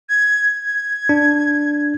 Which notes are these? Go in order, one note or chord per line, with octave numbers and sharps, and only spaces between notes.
G#6
G#6
D4